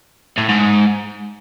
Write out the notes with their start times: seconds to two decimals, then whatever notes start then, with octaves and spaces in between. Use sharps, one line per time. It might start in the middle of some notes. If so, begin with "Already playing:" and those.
0.38 A2
0.49 G#2